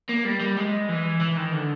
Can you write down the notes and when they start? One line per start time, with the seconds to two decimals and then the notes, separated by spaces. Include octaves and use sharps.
0.09 A#3
0.25 G3
0.40 G3
0.57 G#3
0.88 E3
1.20 E3
1.37 D#3
1.53 D3